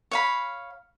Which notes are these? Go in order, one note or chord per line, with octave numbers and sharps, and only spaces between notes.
C#5 F5 B5